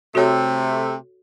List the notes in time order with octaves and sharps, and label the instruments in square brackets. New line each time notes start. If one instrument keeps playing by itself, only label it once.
[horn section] C3 A3 [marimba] F#4 A4 C#5